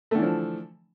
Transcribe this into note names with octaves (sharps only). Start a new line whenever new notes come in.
D3 E3 F3 A3